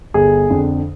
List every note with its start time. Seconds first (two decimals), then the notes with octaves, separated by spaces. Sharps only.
0.14 G1 G#4
0.50 F2 D3